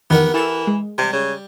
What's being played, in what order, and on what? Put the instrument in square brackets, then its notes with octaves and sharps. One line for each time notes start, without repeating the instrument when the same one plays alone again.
[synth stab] F2 D#3 E3 [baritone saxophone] B3 [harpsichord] G4 A#4 F#5
[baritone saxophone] E3 [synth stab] E4 A4 E7
[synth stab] G#3
[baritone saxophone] C3 [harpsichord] G3
[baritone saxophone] C#3